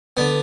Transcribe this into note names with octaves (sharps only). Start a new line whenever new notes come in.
D3 B3